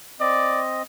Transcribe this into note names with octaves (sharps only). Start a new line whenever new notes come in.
C4 D5 D#5